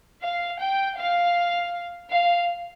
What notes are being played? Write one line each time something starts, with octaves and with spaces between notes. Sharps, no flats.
F5
G5
F5
F5